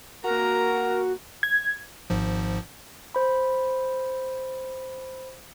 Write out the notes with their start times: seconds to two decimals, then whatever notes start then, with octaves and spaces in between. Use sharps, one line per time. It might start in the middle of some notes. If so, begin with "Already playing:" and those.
0.24 A#3 F#4 A#4 A#5
1.43 G#6
2.10 G#1 G#2 F3
3.15 C5 B5